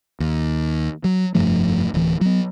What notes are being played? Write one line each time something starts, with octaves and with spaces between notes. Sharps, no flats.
D#2
F#3
F1 G2 F3 A3
D1 E3
F#3 B3